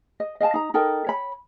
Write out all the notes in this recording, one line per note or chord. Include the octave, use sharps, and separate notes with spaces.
D#5
D#5 F5 G#5 A5
D#4 A#5
D#4 A4 A#4 G5
C#5 B5